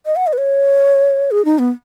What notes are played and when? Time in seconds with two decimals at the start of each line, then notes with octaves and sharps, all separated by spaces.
0.06 D#5
0.16 F#5
0.27 D#5
0.33 B4
0.38 C#5
1.31 G#4
1.45 D#4
1.59 B3